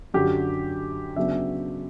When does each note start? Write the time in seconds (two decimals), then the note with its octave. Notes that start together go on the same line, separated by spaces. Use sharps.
0.14 F#2 D3 F#3 G4
1.16 C#3 F#3 B3 D4 E5